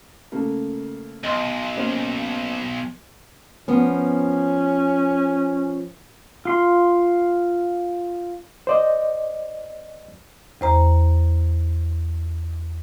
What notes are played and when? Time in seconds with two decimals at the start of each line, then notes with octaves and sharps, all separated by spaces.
0.32 C#3 A3 A#3
1.24 B1 D#5 C6
1.77 A#3 C#4 C5
3.68 F3 B3 C#4
6.45 F4 C6
8.67 C5 D5 D#5
10.61 E2 C5 A#5